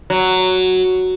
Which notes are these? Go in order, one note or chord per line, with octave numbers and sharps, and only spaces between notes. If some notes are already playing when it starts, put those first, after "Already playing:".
F#3